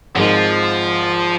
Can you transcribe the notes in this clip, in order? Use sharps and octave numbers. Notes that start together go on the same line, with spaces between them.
G#1 G#2 D#3 F3 G#3